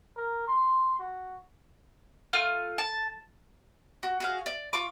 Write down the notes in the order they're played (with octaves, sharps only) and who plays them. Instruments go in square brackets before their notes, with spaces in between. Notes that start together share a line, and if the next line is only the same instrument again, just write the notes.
[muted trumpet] A#4
C6
F#4
[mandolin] A3 F4 F6
A5
F#4
F#4 G#4 F5
D5
F4 C#6 D6